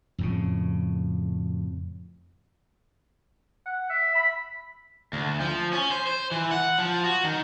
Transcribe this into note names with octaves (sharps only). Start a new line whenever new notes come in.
F2 A2 C#3
F#5
E5
B5
D2
F3
C#4
C5
C5
E3
F#5
F3
F#4
D#3